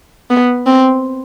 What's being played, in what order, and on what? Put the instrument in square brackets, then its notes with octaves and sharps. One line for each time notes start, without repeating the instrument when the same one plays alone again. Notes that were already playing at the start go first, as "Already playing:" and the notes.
[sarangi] B3
C4